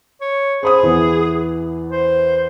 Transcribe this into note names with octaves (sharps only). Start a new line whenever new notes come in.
C#5
G#4 C5 B5 D#6
E2 E3 B3
C5